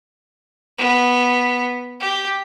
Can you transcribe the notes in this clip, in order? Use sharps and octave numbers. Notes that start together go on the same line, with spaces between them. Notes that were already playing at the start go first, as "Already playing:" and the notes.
B3
G4